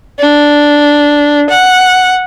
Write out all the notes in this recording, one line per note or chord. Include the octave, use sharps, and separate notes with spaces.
D4
F#5